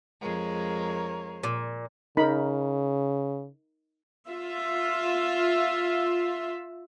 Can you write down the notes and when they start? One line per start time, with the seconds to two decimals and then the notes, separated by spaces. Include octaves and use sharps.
0.21 F2 G#3 A#4 C#5
1.43 A#2
2.17 C#3 D#4 A#4 B5
4.29 F4 E5